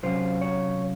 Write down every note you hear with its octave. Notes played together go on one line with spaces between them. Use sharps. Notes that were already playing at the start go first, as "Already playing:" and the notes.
C3 F#3 C#4 F4 C5
C#5